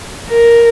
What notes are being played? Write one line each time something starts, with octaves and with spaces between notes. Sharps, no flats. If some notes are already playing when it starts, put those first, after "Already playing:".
A#4